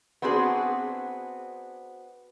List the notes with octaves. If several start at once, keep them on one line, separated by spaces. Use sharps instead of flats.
B3 C4 D4 F#4 G#4